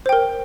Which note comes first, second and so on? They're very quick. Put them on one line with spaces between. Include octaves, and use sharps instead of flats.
C5 G5 A#4